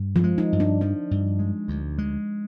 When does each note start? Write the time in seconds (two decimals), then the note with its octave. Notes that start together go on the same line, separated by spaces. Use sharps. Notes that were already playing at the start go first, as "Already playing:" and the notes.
Already playing: G2
0.16 F3
0.24 G#3
0.38 D#4
0.53 G2
0.60 D4
0.81 F3 D4
1.11 G2
1.39 G#3
1.68 D2
1.98 G#3